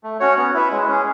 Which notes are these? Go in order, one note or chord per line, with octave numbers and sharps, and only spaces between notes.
A3
C#4 F#4 C#5
B3
E4 B4 E5
G#3
C#4 G#4